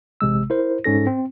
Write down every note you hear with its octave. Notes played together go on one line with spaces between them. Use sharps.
A1 C3 G#3 E6
E4 A#4 C5
G#2 C#4 A4 A#6
C4